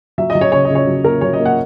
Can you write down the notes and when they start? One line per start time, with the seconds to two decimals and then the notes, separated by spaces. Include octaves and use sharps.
0.18 F#3 E5
0.30 D#5
0.35 F#3
0.41 C#5
0.52 C#3 C#5
0.65 D#5
0.70 C#3 C#5
0.87 F#3
1.04 A#3 A#4
1.21 F#3 C#5
1.33 D#5
1.40 A#3
1.45 F#5